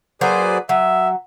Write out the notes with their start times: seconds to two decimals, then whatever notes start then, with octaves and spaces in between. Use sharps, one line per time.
0.21 F#3 A#3 G#4 B4 C5 D5
0.69 F#3 E5